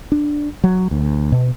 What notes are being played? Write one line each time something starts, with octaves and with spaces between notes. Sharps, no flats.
D4
F#3
D2
B2